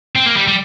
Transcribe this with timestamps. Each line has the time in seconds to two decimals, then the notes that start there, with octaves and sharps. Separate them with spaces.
0.16 C4
0.26 A#3
0.37 G3
0.48 G3